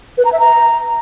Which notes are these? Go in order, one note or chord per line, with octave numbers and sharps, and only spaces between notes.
B4
A#5
E5
A#5